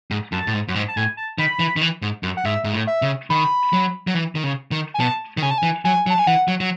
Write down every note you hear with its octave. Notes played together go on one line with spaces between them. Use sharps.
G#2
F#2 A5
A2
G#2
F#2
G#2
A5
A2 G#5
A5
D#3 B5
E3
D#3
E3
G#2
F#2
F#5
G#2 E5
G#2
A2
E5
C#3
D#3 B5
F#3
F#3
E3
D#3
C#3
D#3
G#5
B2 A5
D#3
C#3 G#5
A5
G#5
E3
F#3 G#5
F#3
A5
G#5
E3 F#5
F#3
F#3